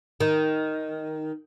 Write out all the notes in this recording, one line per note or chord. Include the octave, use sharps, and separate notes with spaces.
D#3